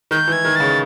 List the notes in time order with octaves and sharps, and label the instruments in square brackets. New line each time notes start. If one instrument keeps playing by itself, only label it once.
[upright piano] D#3 [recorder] G6
[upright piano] E3
[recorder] G#6
[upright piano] D#3
[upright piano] C#3 [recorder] A6